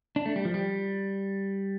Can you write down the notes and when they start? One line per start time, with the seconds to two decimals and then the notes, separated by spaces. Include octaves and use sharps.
0.16 D4
0.26 A3
0.36 G3
0.45 F3
0.54 G3